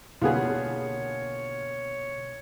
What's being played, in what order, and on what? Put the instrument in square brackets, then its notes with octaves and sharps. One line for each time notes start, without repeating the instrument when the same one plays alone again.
[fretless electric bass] B2 D3 A#3 [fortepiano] G3 B3 G#4 [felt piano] F4 [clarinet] C#5